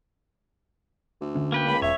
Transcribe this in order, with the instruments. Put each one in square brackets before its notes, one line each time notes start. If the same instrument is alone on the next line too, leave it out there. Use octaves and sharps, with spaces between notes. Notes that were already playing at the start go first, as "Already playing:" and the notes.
[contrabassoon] D2
[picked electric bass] D3 A3 C#4
[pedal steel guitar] A#3 B4 G5
[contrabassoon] C#2 [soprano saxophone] B5
[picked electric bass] E1 [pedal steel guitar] C#5 [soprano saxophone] E5